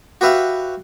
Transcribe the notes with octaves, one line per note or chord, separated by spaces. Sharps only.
F#4 G4 B4 E5 F5